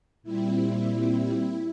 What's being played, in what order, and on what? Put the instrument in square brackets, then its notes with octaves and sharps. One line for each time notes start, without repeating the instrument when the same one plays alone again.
[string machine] A#2 G3 C4 E4